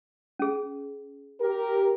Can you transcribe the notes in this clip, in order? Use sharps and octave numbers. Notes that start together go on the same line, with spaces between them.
C#4 G#4
G4 A#4